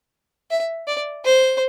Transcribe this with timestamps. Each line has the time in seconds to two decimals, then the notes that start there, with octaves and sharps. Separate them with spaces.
0.51 E5
0.87 D5
1.25 C5